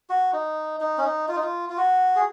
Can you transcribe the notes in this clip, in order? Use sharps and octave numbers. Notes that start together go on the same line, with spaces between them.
F#4
D#4
D#4
C#4
D#4
F4
D#4
F4
F4
F#4
G#4